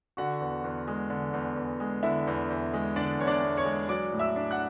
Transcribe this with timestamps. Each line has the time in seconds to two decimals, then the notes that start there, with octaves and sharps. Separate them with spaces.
0.17 D3 F#4 F#5
0.41 E2
0.64 E2
0.88 G#3
1.10 D3
1.33 E2
1.57 E2
1.80 G#3
2.03 D3 E4 E5
2.27 E2
2.50 E2
2.74 G#3
2.96 D3 D4 D5
3.19 E2 C#5
3.27 D4 D5
3.43 E2
3.58 C#5 C#6
3.65 G#3
3.89 F#3 D5 D6
4.12 A2
4.19 E5 E6
4.36 D4
4.51 F#5 F#6